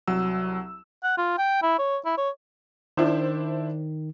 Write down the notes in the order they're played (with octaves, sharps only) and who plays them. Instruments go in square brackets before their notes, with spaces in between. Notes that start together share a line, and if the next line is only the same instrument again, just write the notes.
[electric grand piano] C2 F#3 E6
[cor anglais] F#5
F4
G5
E4
C#5
E4
C#5
[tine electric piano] D#3 [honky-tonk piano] D4 E4 C5